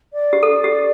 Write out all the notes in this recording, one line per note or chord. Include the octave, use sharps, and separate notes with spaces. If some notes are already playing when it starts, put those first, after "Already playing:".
D5
G4
A4
G4